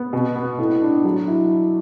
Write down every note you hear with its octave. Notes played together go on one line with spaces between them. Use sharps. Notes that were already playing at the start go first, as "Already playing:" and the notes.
Already playing: B3
B2
B3
A2
D4
F#3
E4